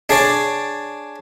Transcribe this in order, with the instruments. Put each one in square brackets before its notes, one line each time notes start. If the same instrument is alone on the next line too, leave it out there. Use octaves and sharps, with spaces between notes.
[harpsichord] D4 G#4 C#5 D5